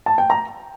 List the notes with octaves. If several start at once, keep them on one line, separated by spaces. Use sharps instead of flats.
A5
G5
A#5